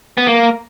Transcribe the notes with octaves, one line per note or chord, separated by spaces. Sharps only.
B3
A#3